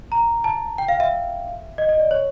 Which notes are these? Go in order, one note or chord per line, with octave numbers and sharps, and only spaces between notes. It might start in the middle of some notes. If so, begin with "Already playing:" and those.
A#5
A5
G5
F5
E5
D#5
D#5
D5
C#5